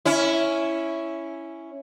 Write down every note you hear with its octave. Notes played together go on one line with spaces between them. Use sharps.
C#4 E4